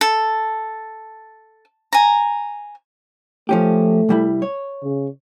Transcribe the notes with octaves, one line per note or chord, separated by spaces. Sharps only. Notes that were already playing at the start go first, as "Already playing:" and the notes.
A4
G#5 A#5
F3 A3 C#4 G4
C2 G3 E4
C#5
C#3